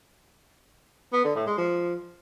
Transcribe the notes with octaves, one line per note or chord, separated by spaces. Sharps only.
B3
D3
A2
G#3
F3